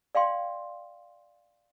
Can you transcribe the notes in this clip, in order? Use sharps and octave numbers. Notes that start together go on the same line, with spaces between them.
D5 F5 G5 C6